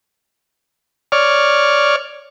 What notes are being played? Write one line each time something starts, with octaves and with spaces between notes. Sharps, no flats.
C#5 D5 F6